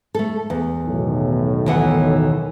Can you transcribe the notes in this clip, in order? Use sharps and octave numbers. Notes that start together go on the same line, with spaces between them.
A3 A4
E2
B1 A2 D#3
D#2 E3 F#5